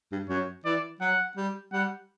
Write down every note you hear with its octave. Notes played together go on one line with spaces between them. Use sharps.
G2
F#2 C#5
E3 D5
F#3 F#5
G3
G3 F#5